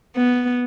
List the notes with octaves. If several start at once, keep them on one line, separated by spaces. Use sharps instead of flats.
B3